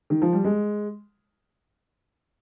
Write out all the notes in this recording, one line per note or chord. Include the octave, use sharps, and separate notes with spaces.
D#3
F3
G3
G#3